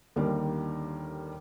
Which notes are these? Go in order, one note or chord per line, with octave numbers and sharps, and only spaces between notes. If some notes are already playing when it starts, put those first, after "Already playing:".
D#2 D3 D#3 G3 A#3